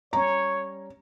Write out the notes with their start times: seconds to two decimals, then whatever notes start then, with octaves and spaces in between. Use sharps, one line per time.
0.13 G3 C#4 C#5 A#5